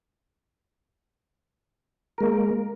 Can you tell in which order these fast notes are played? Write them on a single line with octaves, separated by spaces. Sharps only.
A#4 G#3 A#3